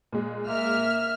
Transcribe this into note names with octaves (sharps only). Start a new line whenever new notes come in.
A#2 G#3
A#3 E5 F6